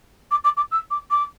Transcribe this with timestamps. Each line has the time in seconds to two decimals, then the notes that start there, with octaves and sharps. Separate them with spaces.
0.31 D6
0.44 D6
0.57 D6
0.71 E6
0.90 D6
1.10 D6